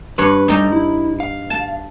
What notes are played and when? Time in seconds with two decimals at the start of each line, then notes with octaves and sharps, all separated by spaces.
0.18 G2 B4 C#5
0.48 G3 D#4 A4 D5 G5 A#5
0.72 E4
1.20 F5
1.50 A5